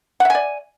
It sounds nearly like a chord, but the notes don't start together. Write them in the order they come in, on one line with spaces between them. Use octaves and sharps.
F#5 E5 G#5 D5